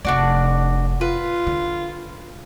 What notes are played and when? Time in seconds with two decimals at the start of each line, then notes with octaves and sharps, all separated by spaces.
0.05 F1 D4 F#4 D5
1.01 F4 B4
1.47 D3